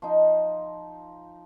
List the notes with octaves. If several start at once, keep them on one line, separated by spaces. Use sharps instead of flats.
F3 D#4